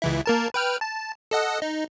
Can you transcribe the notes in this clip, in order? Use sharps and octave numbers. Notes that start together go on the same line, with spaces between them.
C#2 E3 E4
A#3 A#4 A5
B4 G5 F6
A5
A4 D#5 F#5
D#4